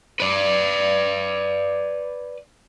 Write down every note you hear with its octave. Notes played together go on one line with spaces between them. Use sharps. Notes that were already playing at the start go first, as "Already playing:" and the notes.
B4 D5